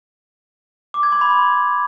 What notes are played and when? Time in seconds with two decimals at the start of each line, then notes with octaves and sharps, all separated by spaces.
0.94 D6
1.03 G#6
1.12 C6
1.21 B5
1.30 C6